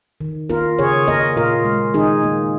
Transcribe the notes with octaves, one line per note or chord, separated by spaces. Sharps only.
D#3
A#3 F4 A#4
C#3 G#4 C#5
A#3 A#4 D#5
A#2 F4 A#4
G#3
D#3 D#4 G#4
A#3